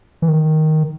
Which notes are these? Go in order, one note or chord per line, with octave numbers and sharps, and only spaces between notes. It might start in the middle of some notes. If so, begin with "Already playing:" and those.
E3
D#3